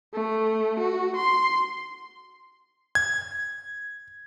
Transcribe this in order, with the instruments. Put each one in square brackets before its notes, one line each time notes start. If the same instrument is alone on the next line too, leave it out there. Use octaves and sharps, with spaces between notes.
[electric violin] A3
F#4
C6
[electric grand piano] G#6